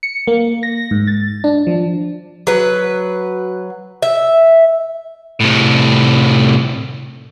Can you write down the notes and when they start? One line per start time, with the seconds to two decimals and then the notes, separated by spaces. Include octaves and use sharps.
0.03 C#7
0.27 A#3
0.63 A#6
0.91 G#2
1.07 A6
1.44 D4
1.67 F3
2.47 F#3 B4
4.02 E5
5.41 C2 A2